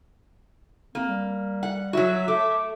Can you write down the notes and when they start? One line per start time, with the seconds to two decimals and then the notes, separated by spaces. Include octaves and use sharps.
0.95 A#3 C4
1.08 G3
1.63 F#5
1.93 F#3 F#4 E5
2.28 A3 D6